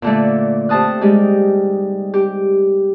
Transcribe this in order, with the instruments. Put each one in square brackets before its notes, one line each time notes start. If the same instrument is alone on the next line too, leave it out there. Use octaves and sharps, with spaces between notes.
[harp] A#2 D3 A3
C3 C5 A5 D#6 F#6
G3 G#3 D#4 G4
G4